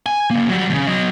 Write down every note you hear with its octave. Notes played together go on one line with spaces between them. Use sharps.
G#5
C#3 A#3
F#3 G3
E2 C#3
F#3 D#5